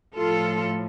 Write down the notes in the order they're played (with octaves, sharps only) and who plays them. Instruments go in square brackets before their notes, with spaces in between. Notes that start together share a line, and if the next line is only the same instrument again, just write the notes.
[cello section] A2 F3 F4 A4